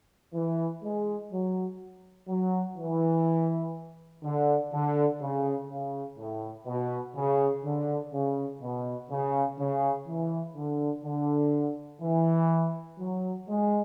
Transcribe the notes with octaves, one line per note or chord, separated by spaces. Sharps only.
E3
G#3
F#3
F#3
E3
D3
D3
C#3
C#3
A2
B2
C#3
D3
C#3
B2
C#3
C#3
E3
D3
D3
E3
F#3
G#3